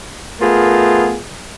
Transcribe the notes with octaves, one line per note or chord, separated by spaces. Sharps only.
A3 B3 F4 G#4 A#4